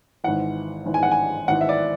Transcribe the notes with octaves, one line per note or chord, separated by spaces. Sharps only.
G#1 G#2 E3 F#5
G#1 G#2 E3
G#5
F#5
G#5
G#1 G#2 E3 F#5
E5
D5